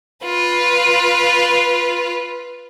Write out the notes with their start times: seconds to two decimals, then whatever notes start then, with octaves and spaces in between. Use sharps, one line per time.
0.24 F4 B4